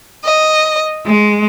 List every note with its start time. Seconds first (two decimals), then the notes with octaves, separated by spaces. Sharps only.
0.24 D#5
1.07 G#3